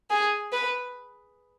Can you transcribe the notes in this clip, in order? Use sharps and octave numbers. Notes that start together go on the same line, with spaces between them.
G#4
B4